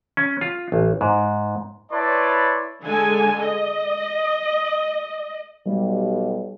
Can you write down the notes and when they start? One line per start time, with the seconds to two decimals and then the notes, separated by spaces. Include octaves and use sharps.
0.17 C#4
0.41 F4
0.72 A1
1.01 G#2
1.92 E4 B4 C#5 D5 A5 C6
2.83 D3 G#3 A4 G#5
3.40 D#5
5.66 B1 G3